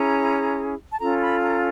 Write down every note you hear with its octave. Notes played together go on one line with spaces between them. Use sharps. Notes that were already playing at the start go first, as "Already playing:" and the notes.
Already playing: C#4 E4 G#4 A#5
A5
C#4 F4 A4 A#5
B5
A#5